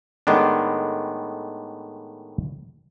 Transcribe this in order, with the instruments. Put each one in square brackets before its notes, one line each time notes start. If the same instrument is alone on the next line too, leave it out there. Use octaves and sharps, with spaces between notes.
[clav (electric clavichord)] A2 D#3 G#3 B3 D4